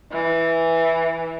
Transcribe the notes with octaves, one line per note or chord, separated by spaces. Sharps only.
E3